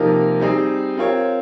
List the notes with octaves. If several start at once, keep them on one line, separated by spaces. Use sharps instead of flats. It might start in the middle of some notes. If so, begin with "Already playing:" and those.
Already playing: C3 F3 A#3 D#4 A#4
G3 C4 D#4 G#4
C4 F4 A#4 C#5